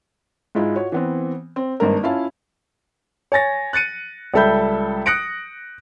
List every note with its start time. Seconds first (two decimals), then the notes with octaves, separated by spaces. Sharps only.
0.55 G#2 G#3 E4 F4
0.76 F4 F#4 C#5
0.92 E3 B3 C4
1.56 C4
1.80 G#1 G2 A#3 A#4
2.03 C#4 E4 F4 F5 A5
3.32 C#5 G#5 A6 A#6
3.73 F#6 A6 C#7 D#7
4.34 C#2 G3 A4 E5 B5 G6
5.06 D#6 F#6 A#6 C#7 D7